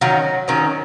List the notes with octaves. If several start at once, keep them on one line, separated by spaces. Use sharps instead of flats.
D#3 F#3 C#4
D#3 F#3 C#4